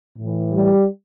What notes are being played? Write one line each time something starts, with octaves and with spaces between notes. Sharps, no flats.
A2 E3
G3